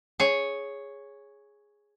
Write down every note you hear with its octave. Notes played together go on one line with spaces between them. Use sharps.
G#4 C#5